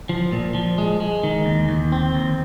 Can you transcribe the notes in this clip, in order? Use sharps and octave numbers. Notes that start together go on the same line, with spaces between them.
F3
A#2
F3
G#3
G#3
D#3
D#2
D#2
C4
D#2